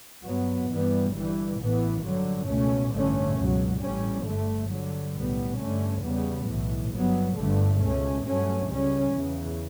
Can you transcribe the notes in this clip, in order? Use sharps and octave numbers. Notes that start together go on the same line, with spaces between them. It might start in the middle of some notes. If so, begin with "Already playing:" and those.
G2 F#3 B3
G2 E3 G3 B3
G1 G2 E3 G3
A1 A2 E3 B3
G2 D3 F#3
C#2 B2 A3 C#4
A1 G2 D3 A3 C#4
C#2 B2 F#3
A1 A2 G3 C#4
G1 G2 D3 A3
G2 D3 F#3
B1 A2 G3 B3
G2 D3 A3 C#4
E2 C#3 G3 B3
B1 A2 E3
G1 G2 F#3 B3
G1 G2 D3 A3
C#2 B2 A3 C#4
G2 F#3 A3 C#4
C#2 C#3 G3 C#4
E2 C#3 E3